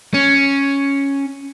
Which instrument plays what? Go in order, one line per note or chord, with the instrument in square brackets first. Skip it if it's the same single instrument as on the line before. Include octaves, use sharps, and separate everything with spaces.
[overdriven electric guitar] C#4